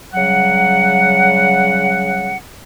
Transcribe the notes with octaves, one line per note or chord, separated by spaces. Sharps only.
C#3 F#3 G3 F#5